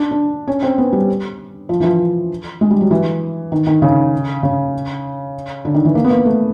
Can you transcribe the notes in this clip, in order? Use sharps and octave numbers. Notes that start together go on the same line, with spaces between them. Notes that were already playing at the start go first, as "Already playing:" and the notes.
Already playing: D4
D4
C#4
C4
B3
G3
F3
E3
F3
G#3
G3
F#3
E3
D#3
D#3
C#3
C#3
D3
D#3
E3
A#3
B3
A#3
A3